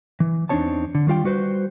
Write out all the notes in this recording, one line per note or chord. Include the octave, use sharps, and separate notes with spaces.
E3
E2 C4 D4 D#4 C#5 A5
D3
D#3 G3 F4 G5
G3 F#4 B4 C5